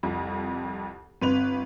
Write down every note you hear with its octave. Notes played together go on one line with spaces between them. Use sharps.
C2 F2
G1 C4 B4 F7